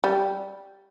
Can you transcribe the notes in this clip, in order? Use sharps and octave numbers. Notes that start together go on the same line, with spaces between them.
G3